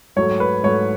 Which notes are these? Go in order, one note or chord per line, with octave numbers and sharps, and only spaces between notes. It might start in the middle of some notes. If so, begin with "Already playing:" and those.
G#2 F#3 A3 C#5
B4
G#2 F#3 A3 C#5